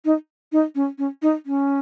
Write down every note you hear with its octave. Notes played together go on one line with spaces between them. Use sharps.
D#4
D#4
C#4
C#4
D#4
C#4